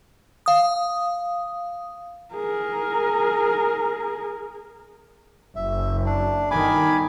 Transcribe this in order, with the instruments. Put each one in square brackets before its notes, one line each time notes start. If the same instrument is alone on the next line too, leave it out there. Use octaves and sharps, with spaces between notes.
[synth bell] F5 D#6
[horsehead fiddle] G#4 A#4
[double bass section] F#1 [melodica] E5
[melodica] D4
[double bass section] G1 D#3 [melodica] G#5 B5 D6